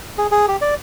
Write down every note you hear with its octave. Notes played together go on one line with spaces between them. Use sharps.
G#4
G#4
G4
D5